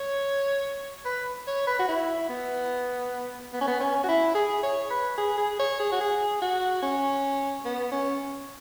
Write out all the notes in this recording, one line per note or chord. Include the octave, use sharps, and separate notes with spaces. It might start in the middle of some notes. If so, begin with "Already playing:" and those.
Already playing: C#5
B4
C#5
B4
F#4
E4
B3
B3
C#4
B3
C#4
F#4
E4
G#4
C#5
B4
G#4
G#4
C#5
G#4
F#4
G#4
F#4
C#4
B3
C#4